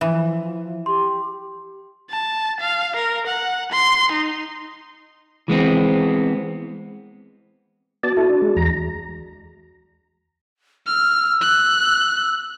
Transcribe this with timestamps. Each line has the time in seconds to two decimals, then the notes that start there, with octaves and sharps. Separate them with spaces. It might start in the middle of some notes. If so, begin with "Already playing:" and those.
0.01 E3 F3 E5
0.86 G4 C6
2.10 A5
2.60 F5
2.96 A#4
3.27 F#5
3.72 C6
4.12 D#4
5.48 E3 G#3 B3 C4
8.03 B3 F#4 D5 A5
8.17 E4 A4
8.29 D4
8.42 G#3
8.57 E2 A#5
10.87 E6 F6
11.41 F#6